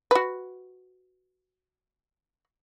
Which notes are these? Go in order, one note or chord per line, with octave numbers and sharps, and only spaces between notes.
F#4 B4